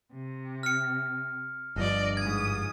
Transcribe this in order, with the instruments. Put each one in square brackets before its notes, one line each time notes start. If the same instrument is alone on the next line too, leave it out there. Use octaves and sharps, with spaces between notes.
[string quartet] C3
[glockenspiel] F6 C#7
[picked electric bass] G1 G2 F3 [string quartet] D5 D#5
[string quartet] G#2 D#6 [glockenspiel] G#6